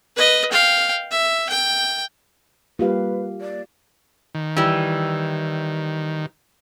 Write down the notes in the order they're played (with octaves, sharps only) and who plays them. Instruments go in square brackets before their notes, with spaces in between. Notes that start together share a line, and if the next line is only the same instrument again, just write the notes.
[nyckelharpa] B4 D#5
F5 G5
E5
G5
[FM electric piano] G3 A#3 [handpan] F4 G4 F5 [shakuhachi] B4
[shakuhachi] D5
[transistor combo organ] D#3
[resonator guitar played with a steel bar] E3 G3